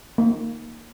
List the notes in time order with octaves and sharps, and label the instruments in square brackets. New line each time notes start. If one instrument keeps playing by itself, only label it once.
[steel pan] A#3